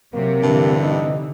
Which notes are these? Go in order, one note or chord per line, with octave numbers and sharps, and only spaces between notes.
C3 F#3 A#3
G2 D3 E3
D#4